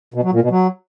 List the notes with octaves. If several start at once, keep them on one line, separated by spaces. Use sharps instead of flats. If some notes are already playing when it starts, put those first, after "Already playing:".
B2
F#3
A#2
B2
F#3